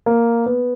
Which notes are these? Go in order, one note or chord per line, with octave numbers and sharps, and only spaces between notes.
A#3
B3